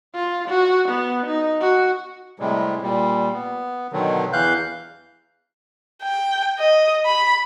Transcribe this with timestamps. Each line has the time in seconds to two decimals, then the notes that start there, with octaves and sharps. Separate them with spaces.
0.15 F4
0.48 F#4
0.89 B3
1.27 D#4
1.61 F#4
2.40 A2 C3 G3 G#3
2.82 A#2 G3
3.34 B3
3.93 B2 D3 D#3 F#3
4.33 E2 E3 F5 F#6 G6
6.03 G5
6.58 D#5
7.06 B5